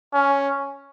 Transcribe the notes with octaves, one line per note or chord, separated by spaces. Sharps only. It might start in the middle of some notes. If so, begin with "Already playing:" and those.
C#4